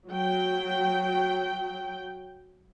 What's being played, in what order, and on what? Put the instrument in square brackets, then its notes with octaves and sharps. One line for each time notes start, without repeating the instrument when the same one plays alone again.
[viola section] F#3 G5